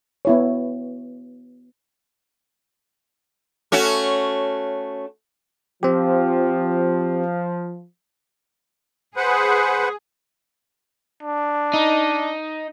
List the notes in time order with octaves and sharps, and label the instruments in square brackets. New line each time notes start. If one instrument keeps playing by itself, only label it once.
[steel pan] B3 E4 C#5
[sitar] A3 C#4 F#4
[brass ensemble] F3 [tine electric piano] C4 G4
[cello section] G#4 [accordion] B4 C5 F#5
[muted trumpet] D4
[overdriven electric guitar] D#4